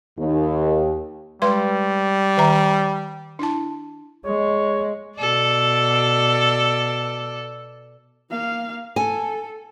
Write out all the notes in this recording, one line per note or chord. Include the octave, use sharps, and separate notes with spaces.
D#2
G3 G#3 B4 C6
D#3 E5 A#5
D4 E4 A5
G#3 C#5
B2 A4 D5
A#3 F5
A4 G#5